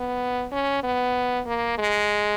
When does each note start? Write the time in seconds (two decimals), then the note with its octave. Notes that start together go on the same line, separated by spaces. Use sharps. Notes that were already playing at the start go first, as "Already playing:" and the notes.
Already playing: B3
0.52 C#4
0.84 B3
1.47 A#3
1.78 G#3